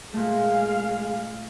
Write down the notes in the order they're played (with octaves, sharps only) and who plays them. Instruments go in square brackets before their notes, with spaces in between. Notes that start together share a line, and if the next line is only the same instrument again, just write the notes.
[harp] A#2 A3 [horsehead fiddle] G#3 F5